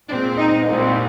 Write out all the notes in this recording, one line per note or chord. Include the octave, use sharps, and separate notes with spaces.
A#2 G#3 C4 D4
D#4
C2 A#2 G#3 C4